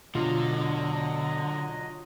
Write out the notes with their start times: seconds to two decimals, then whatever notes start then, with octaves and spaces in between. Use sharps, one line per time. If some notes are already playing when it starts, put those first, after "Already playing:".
0.15 B2 D3 F#3 G#3 F4 D#5